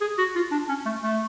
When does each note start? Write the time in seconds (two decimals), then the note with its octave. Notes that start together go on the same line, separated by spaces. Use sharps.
0.01 G#4
0.18 F#4
0.36 F4
0.51 D4
0.69 C#4
0.85 A3
1.03 A3